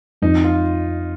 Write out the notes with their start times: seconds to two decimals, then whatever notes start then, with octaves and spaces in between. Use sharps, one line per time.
0.22 F2 D#4
0.44 F4